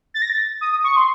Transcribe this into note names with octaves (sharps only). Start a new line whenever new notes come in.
A6
A#6
A6
D#6
C#6
C6